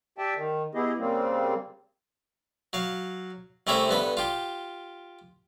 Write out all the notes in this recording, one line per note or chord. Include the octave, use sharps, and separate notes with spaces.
G4 D5 E5 G5 A5
D#3
B3 E4 G4 G#4 D#5
C#3 G3 A#3 C4
F#3 F5
C2 A3 C4 C#4 C#5 E5
G2 B3 A4
F4 G4